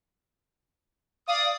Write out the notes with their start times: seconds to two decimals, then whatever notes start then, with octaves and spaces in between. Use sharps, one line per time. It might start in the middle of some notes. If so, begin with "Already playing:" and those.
1.28 D5 F5 D#6